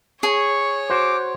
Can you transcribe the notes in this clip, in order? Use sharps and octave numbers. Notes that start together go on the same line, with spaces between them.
G#4 C#5 C#6
F#4 C5 D6